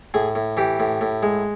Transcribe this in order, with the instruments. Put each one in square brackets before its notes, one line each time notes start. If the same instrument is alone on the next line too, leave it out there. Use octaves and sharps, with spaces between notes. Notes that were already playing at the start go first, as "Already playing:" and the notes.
[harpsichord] A2 G#4
A2
E3 G4
A2
A2
G#3